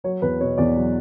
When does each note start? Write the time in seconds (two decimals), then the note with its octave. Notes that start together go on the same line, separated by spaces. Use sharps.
0.04 F#3 C#5
0.22 E2 B4
0.40 B2 C#5
0.58 E2 D5
0.76 F#3